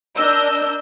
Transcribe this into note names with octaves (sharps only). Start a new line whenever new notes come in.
D4 A#4 D#5 E6 G6